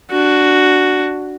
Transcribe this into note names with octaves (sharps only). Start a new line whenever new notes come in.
D4 F#4